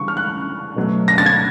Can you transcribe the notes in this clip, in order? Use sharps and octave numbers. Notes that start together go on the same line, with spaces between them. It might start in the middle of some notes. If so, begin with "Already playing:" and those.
Already playing: C#3 E3 G3 C#6
F6
F#6
B2 F#3 A3
A#6
A6
G#6